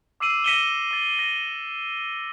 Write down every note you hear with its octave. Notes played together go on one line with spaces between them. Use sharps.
D6 E6 C7 D#7 F#7
A#6 B6 C#7 D#7 E7 G7
D6 A6
A#6